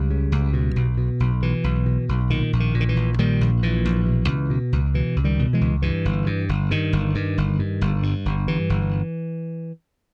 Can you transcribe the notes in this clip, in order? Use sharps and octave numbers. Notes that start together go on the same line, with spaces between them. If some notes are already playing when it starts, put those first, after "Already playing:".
Already playing: C#2 G3
C#3
C#2
B2
B1
B2
B1
B2 E3
B1
B2
B1
A#2 D#3
A#1
D#3
A#2
D#3
E3
A#1
A#2 D#3 G3
A#1
A#2 E3
A#1
B2
C#2
B2
C#2
B2 E3
C#2
D#3 G3
B2
E3 G#3
C#2
G2 E3
G1
G2
G1
G2 D#3
G1
G2
G1
G2
G1
G2
G1
G2 E3
G1